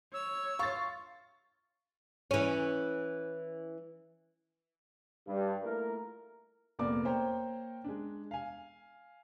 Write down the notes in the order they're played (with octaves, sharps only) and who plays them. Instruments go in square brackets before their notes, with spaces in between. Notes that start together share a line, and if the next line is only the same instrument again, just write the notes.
[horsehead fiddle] C#5 [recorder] E6
[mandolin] F4 [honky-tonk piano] C#6 A6
[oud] E3 C#4
[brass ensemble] G2
A3 A#3 E4 F4 A#4
[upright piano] F1 A#2 A#3 B3 D5 D6
A#3 C5 C#5 G5 A#5
G#3 D4
F5 G#5